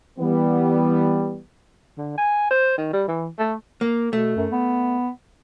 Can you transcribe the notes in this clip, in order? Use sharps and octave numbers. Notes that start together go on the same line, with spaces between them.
E3 G3 B3
D3
G#5
C5
D#3
G3
E3
A3
A#3
B2 A3
F#2
B3